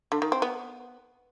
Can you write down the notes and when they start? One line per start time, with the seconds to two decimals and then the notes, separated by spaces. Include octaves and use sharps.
0.12 D3
0.22 D#3
0.32 C4
0.42 B3